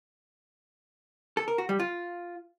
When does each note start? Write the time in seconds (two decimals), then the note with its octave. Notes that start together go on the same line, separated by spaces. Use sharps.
1.37 A4
1.48 A#4
1.58 F#4
1.69 G3
1.80 F4